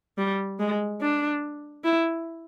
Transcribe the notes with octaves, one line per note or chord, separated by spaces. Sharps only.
G3
G#3
D4
E4